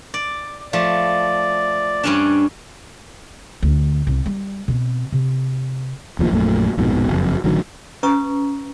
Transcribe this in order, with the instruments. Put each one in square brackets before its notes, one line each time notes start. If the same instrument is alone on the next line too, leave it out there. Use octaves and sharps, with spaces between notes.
[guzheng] D5
[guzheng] F3 A3 [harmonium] D5
[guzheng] G2 C#4 D4
[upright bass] D2
C2
G3
B2 C4
C3
[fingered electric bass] F1 D#2 F3 A#3
A#1 F#2 A#2 A3
A#1 F2 G#2 B2
F#1 F2
A1 D3 D#3 F#3
[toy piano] C#4 B4 A#5 C#6 D#6